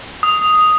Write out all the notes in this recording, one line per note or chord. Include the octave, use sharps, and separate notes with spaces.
D#6